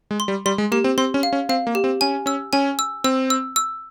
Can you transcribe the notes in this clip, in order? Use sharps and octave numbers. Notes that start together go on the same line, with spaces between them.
G#3
C6
G3
G3 C6
G#3
A#3 G4
C4
C4 C6
C#4
F5
C#4
C4 F5
A#3
G4
C4
C#4 G#5
C#4 E6
C#4 G#5
E6
C4 E6
E6
E6